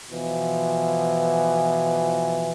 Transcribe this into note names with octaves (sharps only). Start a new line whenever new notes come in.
B2 E3 F3